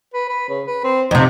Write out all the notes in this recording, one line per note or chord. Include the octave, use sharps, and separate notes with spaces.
B4
B4
C#3
B4
C4
F2 C3 D#4